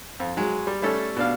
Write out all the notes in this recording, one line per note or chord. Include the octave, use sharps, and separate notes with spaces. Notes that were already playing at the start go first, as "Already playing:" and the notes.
F2
F#3 G#3
G3
G3 A3 C#4 A4
B2 D4 F5